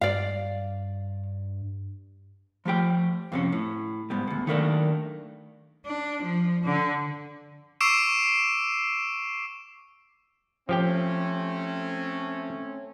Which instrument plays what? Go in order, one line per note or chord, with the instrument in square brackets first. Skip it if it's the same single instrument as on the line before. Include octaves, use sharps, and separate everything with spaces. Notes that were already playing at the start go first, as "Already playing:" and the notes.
[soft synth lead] G2 [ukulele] D5 F5
[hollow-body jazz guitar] F3 A3 G4 G5
F2 C3 C#4
A2
G#2 B2 G3
D2 B2
D#3 F#3 A3 A#3 C#4 D4
[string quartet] D4
F3
D3
[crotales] C#6 D6 E6 C7 D7 E7
[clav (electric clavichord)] F3 G4 G5 [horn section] A3 C4 C#4